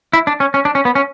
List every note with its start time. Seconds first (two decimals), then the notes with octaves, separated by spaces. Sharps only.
0.13 E4
0.27 D4
0.40 C#4
0.54 C#4
0.65 D4
0.75 C#4
0.85 B3
0.95 C#4